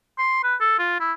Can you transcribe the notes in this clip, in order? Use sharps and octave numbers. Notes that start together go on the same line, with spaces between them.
C6
B4
A4
F4
E4